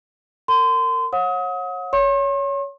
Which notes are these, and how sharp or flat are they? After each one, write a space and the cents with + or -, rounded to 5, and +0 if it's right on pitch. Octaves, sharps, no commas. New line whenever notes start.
A#4 -25 C6 -30
C#5 -30 F#5 -35 D#6 +30
C#5 +15 C6 +45